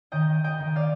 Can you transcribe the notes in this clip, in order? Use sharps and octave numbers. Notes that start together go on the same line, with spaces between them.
D#3 D#5 G5
D#5 G5
D#3
D5 F5